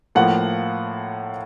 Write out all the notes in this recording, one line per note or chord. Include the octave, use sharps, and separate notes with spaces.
A2 F3 A#3 F#5